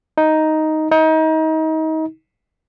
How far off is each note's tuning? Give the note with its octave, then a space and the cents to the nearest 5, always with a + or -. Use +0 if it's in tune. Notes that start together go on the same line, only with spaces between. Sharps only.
D#4 +5
D#4 +30